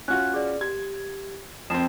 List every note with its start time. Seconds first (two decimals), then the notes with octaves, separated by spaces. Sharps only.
0.08 C#4 F4 F#4 F#6
0.34 G#4 D5
0.61 G4 G#6
1.70 F2 C4 E7